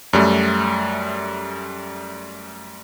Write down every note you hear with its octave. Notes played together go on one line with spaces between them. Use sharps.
F#2 G3 A3